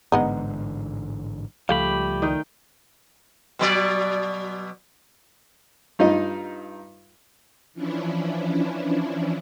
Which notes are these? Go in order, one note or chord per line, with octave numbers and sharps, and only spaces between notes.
A1 G#2 D3 G#3 B3 D#4
C#2 F3 G3 A3 G4 F5 B5
D#3 D#4 G5
B2 F#3 D5
G2 D#4 F4 D#5
E3 F3 C#4 D4 E4